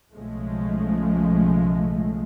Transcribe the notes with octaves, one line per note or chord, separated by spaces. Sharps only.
B1 C#3 F3 G#3 A3